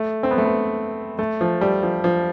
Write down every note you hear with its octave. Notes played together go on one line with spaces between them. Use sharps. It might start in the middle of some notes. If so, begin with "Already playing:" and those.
Already playing: A3
C4
B3
A3
B3
A3
F3
G3
F3
F3